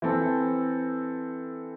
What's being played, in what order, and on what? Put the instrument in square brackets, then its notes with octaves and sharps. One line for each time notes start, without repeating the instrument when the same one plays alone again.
[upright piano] E3 C4 A4